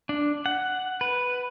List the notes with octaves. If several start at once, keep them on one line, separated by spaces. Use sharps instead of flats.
D4
F#5
B4